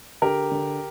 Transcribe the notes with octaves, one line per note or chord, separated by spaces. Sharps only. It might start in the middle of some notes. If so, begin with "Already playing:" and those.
D3 G4 A#4
D3